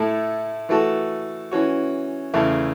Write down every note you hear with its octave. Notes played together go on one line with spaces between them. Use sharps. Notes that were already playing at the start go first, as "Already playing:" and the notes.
Already playing: A2 A3 E4 A4
E3 A3 F#4 A4
E3 C#4 F#4
E2 C#3 A3 E4